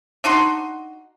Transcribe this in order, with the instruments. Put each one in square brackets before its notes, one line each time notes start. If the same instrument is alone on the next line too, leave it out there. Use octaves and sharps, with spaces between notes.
[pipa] D4 D#4 F#4 C6